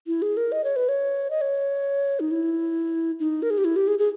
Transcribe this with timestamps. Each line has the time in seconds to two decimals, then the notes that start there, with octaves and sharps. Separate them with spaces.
0.07 E4
0.22 G#4
0.37 A#4
0.52 D#5
0.64 C#5
0.76 B4
0.89 C#5
1.30 D#5
1.41 C#5
2.20 D#4
2.31 E4
3.20 D#4
3.42 A#4
3.50 G#4
3.58 G4
3.65 E4
3.76 G4
3.87 G#4
3.99 G#4